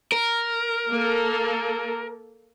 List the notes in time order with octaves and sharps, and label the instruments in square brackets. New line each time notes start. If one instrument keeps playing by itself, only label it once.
[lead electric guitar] A#4
[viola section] A#3 A4